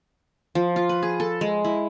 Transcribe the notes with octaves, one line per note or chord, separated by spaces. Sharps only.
F3
F4
B4
G#4
A4
G#3
E4